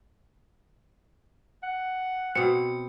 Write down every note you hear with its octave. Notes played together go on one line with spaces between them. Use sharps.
F#5
B2 C4 C#7